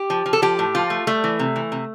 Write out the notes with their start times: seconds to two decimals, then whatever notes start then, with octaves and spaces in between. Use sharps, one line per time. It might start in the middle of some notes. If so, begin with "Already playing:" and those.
Already playing: G4
0.10 F3
0.26 F3
0.33 A4
0.42 F3 G4
0.59 A2
0.75 F3 F4
0.90 A3
1.07 G3 A3
1.24 E3
1.39 C3
1.56 E3
1.72 C3